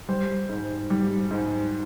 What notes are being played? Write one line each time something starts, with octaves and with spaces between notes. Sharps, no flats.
G3 C5
G#2
G3
G#2